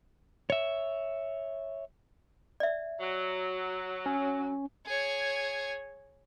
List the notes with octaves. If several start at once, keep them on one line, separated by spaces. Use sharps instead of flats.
C#5 E5
D5 E5
F#3
C#4
G#4 C#5